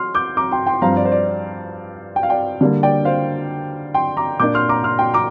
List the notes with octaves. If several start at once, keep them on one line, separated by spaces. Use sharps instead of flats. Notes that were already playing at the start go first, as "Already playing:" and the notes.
Already playing: C6 F6
D6 G6
A#5 D6
G5 C6
G5 C6
G2 F3 C4 F5 A#5
D5
C5
D5
G5
F5
D5 G5
D3 G3 A#3
D5 G5
C5 F5
G5 C6
A#5 D6
A#2 A#3 D4 D6 G6
C6 F6
A#5 D6
C6 F6
G5 C6
A#5 D6